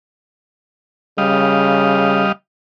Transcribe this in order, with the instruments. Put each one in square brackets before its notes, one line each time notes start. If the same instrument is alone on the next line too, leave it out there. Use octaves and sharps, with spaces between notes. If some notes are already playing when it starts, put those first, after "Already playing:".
[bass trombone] C#3 [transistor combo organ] G3 D#5 F5